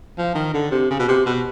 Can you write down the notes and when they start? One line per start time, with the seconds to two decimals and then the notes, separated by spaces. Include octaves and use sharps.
0.18 F3
0.35 D#3
0.54 D3
0.71 C3
0.91 C#3
0.99 B2
1.08 C3
1.26 B2